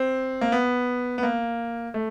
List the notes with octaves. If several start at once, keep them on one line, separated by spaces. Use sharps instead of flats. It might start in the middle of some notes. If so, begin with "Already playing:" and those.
Already playing: C4
A#3
B3
B3
A#3
A3